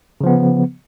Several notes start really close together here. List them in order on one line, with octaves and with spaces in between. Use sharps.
C#3 F3 B3